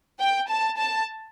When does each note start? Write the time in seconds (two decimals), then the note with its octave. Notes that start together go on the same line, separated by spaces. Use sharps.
0.20 G5
0.49 A5
0.78 A5